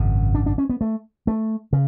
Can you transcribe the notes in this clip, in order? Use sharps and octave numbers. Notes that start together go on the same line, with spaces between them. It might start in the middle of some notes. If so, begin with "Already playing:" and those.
Already playing: G#1 F#2 C#3
D4
D4
C#4
B3
A3
A3
C#3